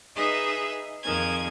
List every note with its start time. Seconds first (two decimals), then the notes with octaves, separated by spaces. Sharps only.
0.15 D#4 G#4 B4 D#5 E5
1.02 F2 D#3 G#4 G#6